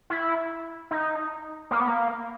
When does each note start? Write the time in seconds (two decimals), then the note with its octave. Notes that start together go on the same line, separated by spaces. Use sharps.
0.10 E4
0.91 D#4
1.71 A#3
1.80 B3
1.88 A#3